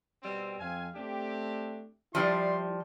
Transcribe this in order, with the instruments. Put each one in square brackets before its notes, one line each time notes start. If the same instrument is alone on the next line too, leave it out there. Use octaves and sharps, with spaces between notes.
[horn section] B2 G3 C4
[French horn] F2 [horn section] C4 F5 G#5
[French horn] A3 [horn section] C4 D4 G4
[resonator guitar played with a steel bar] F3 G3 [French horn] E4 [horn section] D5 B5 C6